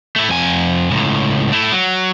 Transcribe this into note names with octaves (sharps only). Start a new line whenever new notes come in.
A3 E4
F2 G#5
C#2 A2
A3 E4
F#3